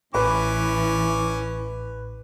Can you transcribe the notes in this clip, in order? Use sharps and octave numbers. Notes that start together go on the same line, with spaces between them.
A1 E3 C#4 B4 D6